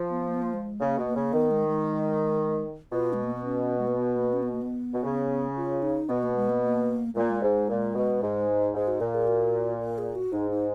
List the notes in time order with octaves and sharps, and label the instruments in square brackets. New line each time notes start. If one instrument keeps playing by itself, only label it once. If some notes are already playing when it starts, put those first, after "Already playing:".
Already playing: [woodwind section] F3
[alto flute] B3
A#3
B3
A#3
G#3
[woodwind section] C#3 [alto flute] A#3
[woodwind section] B2
[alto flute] A#3
[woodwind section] C#3
[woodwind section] D#3 [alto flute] B3
[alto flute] G#3
G#3
[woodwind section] B2 [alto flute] F4
[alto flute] G#3
A#3
B3
C#4
G#3
A#3
B3
A#3
C#4
B3
A#3
B3
[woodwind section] B2
C#3
[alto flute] F4
D#4
[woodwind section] B2 [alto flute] B3
[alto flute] A#3
G#3
A#3
A#3
[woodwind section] A#2 [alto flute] G#3
[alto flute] A#3
G#3
[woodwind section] G#2
A#2
B2
G#2
[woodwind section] G#2 [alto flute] G#4
[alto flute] F#4
[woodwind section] A#2 [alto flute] A#4
[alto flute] G#4
F#4
A#4
G#4
F#4
[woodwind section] G#2 [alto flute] D#4
[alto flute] D#4